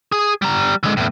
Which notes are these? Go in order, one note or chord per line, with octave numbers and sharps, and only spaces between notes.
G#4
G3 A#5
D3 G#3
E2 A2